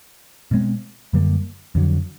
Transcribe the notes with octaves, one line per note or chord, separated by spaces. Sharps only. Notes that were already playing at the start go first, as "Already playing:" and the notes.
B2 G#3 C4
F#2 D3 G3 A#3
F2 D3 F#3